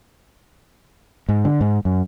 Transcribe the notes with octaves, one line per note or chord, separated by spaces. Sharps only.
G#2
D3
G#2
F#2